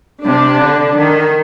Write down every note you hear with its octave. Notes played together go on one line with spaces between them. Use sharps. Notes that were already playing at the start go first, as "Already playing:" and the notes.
C3 D4
D3
D#3